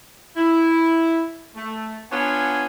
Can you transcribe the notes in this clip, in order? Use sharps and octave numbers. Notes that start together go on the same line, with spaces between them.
E4
A3
B3 D4 F4 C#5 F#5 G#5